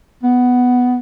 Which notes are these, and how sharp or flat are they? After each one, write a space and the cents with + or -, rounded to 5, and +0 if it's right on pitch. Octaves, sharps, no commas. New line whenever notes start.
B3 +5